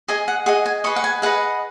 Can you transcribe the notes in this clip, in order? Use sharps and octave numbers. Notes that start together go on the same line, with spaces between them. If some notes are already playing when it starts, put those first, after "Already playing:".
G#4 D#5 G#5
F#5
G#4 D#5 F#5
G#5
G#4 B4 D#5 C#6
F#5
G#5
G#4 B4 D#5 F#5